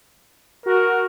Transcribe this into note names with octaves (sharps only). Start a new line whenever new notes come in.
F#4 A#4